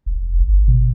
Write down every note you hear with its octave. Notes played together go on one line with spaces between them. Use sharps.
F1
G1
B2